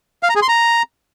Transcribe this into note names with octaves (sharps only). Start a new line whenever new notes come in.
F5
A#5
G#4
C6
A#5